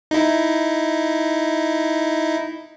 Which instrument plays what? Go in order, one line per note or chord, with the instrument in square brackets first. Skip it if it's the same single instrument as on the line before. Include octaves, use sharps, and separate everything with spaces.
[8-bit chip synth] D#4 E4